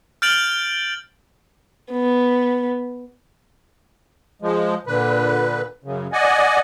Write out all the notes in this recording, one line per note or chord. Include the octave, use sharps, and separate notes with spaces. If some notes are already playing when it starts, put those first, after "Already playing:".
F6 G6 A6 D7 F7 F#7
B3
F3 G#3
A#2 D3 B4
F#2 C#3
D5 D#5 F#5 G#5